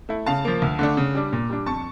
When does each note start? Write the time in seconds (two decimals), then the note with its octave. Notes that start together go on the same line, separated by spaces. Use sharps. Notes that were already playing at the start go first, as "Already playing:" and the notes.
0.09 A3 E4
0.26 C#3 F5 A5
0.45 F3 A#3
0.62 D2
0.79 D3 A3 D4
0.97 C#3
1.15 G3 D4
1.33 A#2
1.50 G3 D4
1.66 F2 A5 C#6